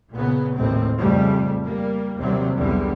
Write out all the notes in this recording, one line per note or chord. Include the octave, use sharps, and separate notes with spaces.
A#2 C#3 B3
A1 D#2 A2 A3 C4
F2 C#3 G3 A3
G3 A#3
D#2 C3 F#3 G3 C4
B1 E2 D3 G3